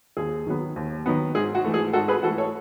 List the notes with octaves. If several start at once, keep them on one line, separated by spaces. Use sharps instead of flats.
D#2 G#4
D#3 F#3 B3
D#2
D#3 F#3 B3
G#2 G#4
F#4
E3 A3
G#4
G#2 F#4 A4
G#4 B4
E3 A3 F#4 A4
A4 C#5